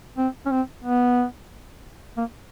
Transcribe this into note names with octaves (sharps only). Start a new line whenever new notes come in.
C4
C#4
C4
B3
A#3